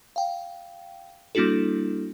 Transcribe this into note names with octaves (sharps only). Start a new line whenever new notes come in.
F5 G5
G3 A#3 D4 E4 F#4 A4